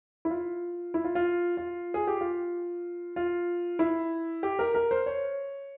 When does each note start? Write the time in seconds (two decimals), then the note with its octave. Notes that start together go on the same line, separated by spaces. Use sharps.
0.25 E4
0.30 F4
0.94 E4
1.05 F4
1.15 F4
1.57 F4
1.94 G#4
2.07 G4
2.21 F4
3.16 F4
3.79 E4
4.43 G4
4.59 A#4
4.75 A#4
4.91 C5
5.06 C#5